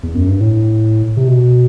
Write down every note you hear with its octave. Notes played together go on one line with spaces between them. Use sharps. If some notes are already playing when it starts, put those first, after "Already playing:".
E2
F#2
G2
A2
C3
B2